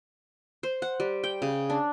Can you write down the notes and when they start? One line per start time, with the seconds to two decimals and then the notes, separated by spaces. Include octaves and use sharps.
0.63 C5
0.82 F#5
1.00 G3
1.24 G5
1.42 C#3
1.70 D4